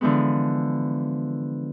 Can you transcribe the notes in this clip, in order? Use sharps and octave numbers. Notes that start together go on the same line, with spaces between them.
D3 E3 F3 G#3 B3